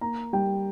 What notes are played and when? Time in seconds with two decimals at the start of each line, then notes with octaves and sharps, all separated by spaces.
0.01 A#3 A#5
0.33 G3 G5